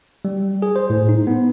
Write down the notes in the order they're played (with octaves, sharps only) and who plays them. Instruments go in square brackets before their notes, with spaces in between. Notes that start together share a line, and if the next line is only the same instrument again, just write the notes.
[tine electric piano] G3
G#4
C5
A2
D#4
B3